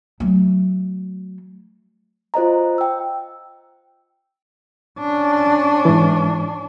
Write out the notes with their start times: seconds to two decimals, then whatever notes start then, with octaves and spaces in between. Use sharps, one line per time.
0.20 F#3 A3
2.34 F4 C5 D#5 A#5
2.78 G5 E6
4.99 C#4 D4
5.85 G#2 E3